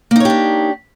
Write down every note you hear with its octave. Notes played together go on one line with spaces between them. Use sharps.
A#3 D4 D#4 G4 C#5